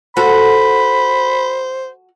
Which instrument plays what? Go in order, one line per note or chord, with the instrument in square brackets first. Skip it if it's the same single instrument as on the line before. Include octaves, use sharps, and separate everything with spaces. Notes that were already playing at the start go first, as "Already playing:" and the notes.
[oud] F#4 A4 [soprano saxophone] C5 [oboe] B5